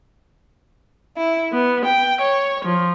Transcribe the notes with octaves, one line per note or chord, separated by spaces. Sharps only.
E4
B3
G5
C#5
F3